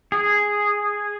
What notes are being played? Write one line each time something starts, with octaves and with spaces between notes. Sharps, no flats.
G#4